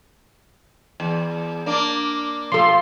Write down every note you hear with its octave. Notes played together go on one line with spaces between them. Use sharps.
E2
A#3 D4
F3 A4 C6